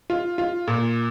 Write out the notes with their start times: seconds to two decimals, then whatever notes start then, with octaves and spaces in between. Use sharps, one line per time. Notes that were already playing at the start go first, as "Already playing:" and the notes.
0.10 F4
0.38 F4
0.67 A#2